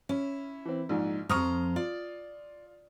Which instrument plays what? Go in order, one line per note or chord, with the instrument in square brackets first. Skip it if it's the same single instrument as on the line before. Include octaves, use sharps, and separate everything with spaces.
[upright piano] C#4 [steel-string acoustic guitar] E4
[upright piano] E3 C4
A#1 G#2
[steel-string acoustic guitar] F2 C5 A#5 [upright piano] C#6 D#6 F6
[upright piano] F4 [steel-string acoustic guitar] D5